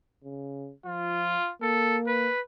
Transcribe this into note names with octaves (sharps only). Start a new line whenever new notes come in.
C#3
F3 F4
A#3 A4
B4